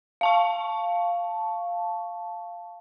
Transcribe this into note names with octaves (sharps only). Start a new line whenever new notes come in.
F5 A5 C#6